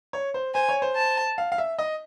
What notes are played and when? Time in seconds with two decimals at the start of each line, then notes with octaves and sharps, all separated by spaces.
0.13 C#5
0.34 C5
0.55 C5 G#5
0.69 C#5
0.82 C5
0.96 A5
1.38 F5
1.52 F5
1.58 E5
1.79 D#5